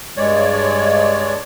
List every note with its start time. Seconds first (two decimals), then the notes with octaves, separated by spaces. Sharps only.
0.17 G2 G#3 C#5 D5